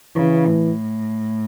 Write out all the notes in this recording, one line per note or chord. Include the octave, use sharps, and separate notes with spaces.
C#3 E3
A2